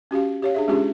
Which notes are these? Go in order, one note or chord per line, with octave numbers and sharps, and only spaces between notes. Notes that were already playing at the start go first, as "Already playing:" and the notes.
C#4 F#4 G4 F5
G4 C#5 F5
D4 G#4 E5
G#3 C#4 D4 F4 G4 G#4